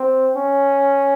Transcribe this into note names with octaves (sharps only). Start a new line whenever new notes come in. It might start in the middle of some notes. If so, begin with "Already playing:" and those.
Already playing: C4
C#4